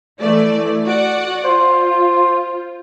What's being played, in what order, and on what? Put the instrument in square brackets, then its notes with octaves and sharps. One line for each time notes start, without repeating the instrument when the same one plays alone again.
[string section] E3 A3 D5
F#4 D5 F#5
[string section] F4 [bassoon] C5